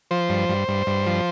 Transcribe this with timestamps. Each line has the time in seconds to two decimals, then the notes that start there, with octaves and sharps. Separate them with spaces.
0.11 F3 C5
0.29 G2
0.49 G2
0.68 G2
0.87 G2
1.06 F3